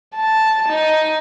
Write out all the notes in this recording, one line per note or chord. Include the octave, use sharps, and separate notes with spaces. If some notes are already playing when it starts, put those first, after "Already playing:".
A5
D#4